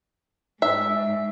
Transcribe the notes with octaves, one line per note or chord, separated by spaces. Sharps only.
G#2 E5